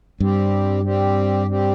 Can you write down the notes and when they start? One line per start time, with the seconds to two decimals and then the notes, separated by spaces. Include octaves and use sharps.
0.20 G2 G3 C4 G4
0.84 G3 C4 G4
1.47 G3 C4 G4